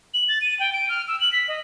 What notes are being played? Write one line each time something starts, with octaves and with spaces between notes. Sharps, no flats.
F#7
A6
D#7
G5
D7
F6
E6
F#7
B6
D#5